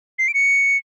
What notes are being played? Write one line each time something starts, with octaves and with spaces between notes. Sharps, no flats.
C7
D7
C#7